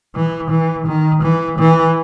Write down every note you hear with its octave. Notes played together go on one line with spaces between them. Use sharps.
E3
E3
D#3
E3
E3